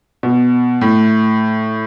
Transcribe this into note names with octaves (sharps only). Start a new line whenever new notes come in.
B2
A2